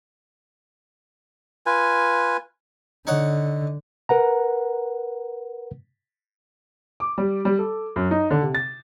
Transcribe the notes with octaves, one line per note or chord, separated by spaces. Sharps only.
F4 B4 G#5
D3 D#4 C#5 F#5
A#4 B4 F#5 A#5
D6
G3
G3
A4
F#2
D#4
D3
C3
A6